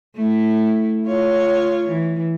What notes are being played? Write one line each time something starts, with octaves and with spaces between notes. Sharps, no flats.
A3 E4
F4 C#5
E3